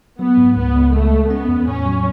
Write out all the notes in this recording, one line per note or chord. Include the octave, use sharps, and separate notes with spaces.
F#3 B3
G#2
C#2 B3
C#2
G#3 A3
G#3
B3 C#4
E2
A2 C#4
F#3